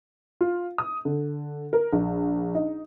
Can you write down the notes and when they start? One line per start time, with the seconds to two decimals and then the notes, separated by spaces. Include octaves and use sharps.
0.41 F4
0.78 D#6
1.05 D3
1.73 A#4
1.93 A#1
2.55 D#4